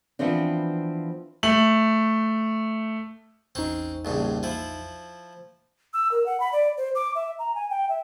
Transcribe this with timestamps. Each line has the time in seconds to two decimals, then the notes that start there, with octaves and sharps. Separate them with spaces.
0.19 E3 F3 B3 C4 D4
1.43 A3 F#7
3.55 A1 E2 C4 C#4 D#4
4.05 A#1 G2 C#3
4.43 F3 E4
5.93 E6
6.11 A#4
6.26 F#5
6.40 B5
6.52 D5
6.77 C5
6.95 D6
7.15 E5
7.39 A#5
7.55 G#5
7.70 G5
7.89 E5